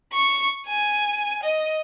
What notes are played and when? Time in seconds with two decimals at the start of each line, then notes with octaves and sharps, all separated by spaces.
0.13 C#6
0.67 G#5
1.43 D#5